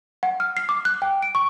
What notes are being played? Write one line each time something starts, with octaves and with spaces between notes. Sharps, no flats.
F#5
F6
C7
D6
F#6
G5
D7
C#6